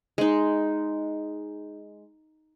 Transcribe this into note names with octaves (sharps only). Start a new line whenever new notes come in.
G#3 D#4